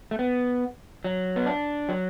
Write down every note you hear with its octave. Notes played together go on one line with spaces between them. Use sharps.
A3
B3
F#3
B3
D4
F#3